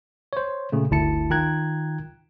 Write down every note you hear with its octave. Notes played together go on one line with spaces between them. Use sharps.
C5 C#5
A#2 C#3 A3
G1 D2 E4 A5 C#7
D#3 F4 G5 A#5 F#6 G#6